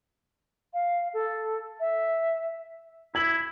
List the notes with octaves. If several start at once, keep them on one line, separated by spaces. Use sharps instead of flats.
F5
A4
E5
E4 G#6 F#7